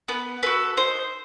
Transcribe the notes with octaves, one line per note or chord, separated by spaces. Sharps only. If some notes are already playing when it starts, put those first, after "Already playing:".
B3 B4
F#4 A4 B4
D#4 C5